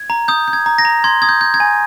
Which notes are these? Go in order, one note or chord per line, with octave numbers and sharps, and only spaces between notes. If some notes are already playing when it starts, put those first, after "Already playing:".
Already playing: G#6
A#5
D#6 G6
G6
G#6
A#5
A#6
A#5
C6 G#6
D#6 G#6
G6
G6
G#6
G#5